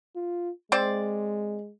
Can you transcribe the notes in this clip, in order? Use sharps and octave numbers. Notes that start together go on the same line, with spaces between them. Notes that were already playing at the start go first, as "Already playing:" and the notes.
F4
G#3 C4 C5 D5